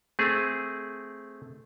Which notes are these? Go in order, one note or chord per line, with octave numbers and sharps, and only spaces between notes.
A3 C4 G#4